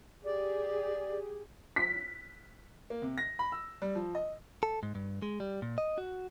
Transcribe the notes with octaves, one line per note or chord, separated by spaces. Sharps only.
G4 G#4 D5
B6
A#3
C3
A#6
B5
E6
G3
F3
D#5
A4
G#2
G2
G#3
G3
A#2
D#5
F#4